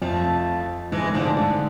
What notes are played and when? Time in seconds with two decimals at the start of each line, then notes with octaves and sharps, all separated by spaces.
0.02 F2 F3 A3
0.92 G#2 E3 G#3
1.04 G#2
1.14 A2 D3 F3
1.25 G#2
1.37 G#2 D3